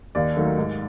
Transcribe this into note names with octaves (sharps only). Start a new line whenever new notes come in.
D#2 D5
D#3 F#3 A3
G#2